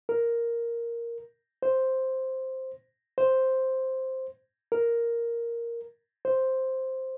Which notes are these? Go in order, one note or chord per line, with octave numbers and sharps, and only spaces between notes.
A#4
C5
C5
A#4
C5